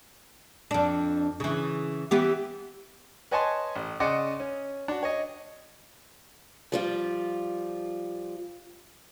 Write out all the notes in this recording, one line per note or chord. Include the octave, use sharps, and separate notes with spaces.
F2 D4
C#3 E3
E3 B3 G4
B4 C#5 D#5 G#5 A5 C6
A1
C#3 D5 D#5 F#5 C6 D6
C#4
D4 F#4
C#5 D#5
F3 G3 F4